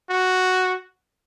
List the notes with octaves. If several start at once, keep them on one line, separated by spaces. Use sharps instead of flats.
F#4